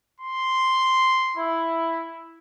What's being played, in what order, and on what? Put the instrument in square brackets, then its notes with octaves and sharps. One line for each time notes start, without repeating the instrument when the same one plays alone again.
[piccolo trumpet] C6
[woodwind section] E4